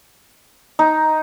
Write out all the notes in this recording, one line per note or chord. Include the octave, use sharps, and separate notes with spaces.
D#4